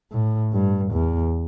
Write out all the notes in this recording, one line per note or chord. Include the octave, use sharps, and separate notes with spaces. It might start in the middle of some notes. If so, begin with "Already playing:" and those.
A2
G2
E2